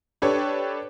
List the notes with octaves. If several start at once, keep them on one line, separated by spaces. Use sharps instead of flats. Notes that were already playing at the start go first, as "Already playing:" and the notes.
D4 G4 A4 B4 C#5